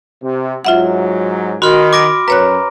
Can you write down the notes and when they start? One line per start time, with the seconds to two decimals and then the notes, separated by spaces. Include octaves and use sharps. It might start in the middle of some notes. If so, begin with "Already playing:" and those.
0.23 C3
0.65 G#2 F#3 F4 E5 F#5
1.62 D#3 F#4 B5 C6 F6
1.93 D6 A#6 D7
2.28 F#2 B4 C#5 A#5 F#6